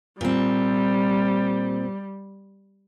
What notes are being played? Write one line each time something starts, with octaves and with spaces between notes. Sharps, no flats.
A#2 G3 C4